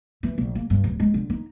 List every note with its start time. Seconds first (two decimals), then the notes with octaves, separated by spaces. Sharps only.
0.23 E3
0.38 A#1
0.55 A#3
0.70 G2
0.84 D1
1.00 G#3
1.14 D3
1.30 D#4